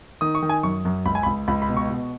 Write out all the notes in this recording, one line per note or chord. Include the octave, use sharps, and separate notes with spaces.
D#3 D#6
C#6
D#3
G#5
F#2 C#6
F#2
C#2 B5
G#5
B5
C#2
C#2 B5
B5
B2
C#6
B2